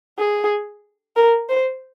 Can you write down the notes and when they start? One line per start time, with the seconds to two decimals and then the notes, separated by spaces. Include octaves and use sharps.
0.18 G#4
1.16 A#4
1.49 C5